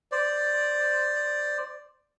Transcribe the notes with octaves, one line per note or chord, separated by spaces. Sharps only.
C5 D5